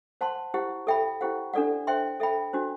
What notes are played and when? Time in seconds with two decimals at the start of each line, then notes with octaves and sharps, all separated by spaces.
0.21 C5 F#5 A5 C6
0.54 E4 G4 C5 F#5
0.87 A4 E5 G5 B5
1.21 E4 G4 C5 F#5
1.54 D4 A4 D5 F#5
1.87 C5 E5 G5 C6
2.20 A4 E5 G5 B5
2.53 D4 F#4 C5